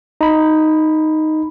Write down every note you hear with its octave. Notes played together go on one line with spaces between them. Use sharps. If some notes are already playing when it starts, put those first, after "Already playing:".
D#4 B5